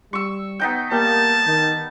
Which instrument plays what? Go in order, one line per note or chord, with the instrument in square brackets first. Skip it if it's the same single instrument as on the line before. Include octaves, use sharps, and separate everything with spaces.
[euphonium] G3 [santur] C#6 E6
[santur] B3 D#4 G5
[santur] G3 [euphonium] A#3 [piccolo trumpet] A5
[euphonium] D#3